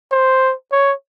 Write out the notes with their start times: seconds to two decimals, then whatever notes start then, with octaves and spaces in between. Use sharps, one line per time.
0.12 C5
0.72 C#5